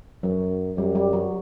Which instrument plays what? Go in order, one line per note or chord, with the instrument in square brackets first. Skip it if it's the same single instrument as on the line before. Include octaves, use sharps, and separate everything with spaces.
[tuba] F#2 [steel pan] F#3
[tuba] F#2 [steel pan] G3
[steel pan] G3
F#3